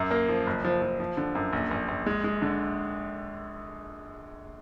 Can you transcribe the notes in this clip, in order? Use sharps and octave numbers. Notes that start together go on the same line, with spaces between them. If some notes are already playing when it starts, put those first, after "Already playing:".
Already playing: F#2
A#3
F3
F#1
F3
F3
F3
D3
F#2
A#1
A#1
A#1
G#3
G#3
D3